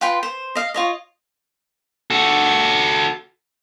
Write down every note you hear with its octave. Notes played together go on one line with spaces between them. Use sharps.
F4 B4 G5 C6
C5
D#5 F5
F4 C#5 D#5
F#4 A4